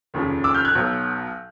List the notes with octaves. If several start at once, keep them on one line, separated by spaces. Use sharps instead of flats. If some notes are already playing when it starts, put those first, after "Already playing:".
F1 D#2 C#3 F3
D6 E6
F6 G6
F#6 G#6
B1 B2 F#3